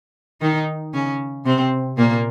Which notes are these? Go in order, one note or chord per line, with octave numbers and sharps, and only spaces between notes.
D#3 D#4
C#3 C#4
C3 C4
A#2 A#3